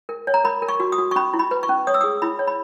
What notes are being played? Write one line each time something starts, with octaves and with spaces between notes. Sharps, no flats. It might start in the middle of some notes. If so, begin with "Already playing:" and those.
A#4
C#5
A#5
A#4 B5
A#4
C#6
F#4
D#6
F#4
C#6
C#4 B5
E4
B5
B4
C#6
C#4
C#5 D#6
E6
G#4 D#6
E4 B5
C#5
B5